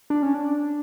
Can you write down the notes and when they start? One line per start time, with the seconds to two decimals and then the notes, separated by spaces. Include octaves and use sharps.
0.10 D4
0.22 C#4
0.34 D4